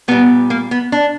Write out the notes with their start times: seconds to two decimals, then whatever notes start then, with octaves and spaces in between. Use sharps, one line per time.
0.08 A#2 G3 B3
0.50 A#3
0.71 B3
0.92 D4